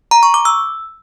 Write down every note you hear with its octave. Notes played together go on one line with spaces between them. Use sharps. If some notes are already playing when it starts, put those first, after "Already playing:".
A#5
C#6
D6
E6